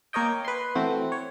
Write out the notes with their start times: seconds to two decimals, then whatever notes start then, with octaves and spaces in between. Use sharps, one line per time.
0.13 A#3 A#4 C#5 D#5 G5
0.45 B4 C6
0.75 E3 A3 C4 F#4
1.12 C#5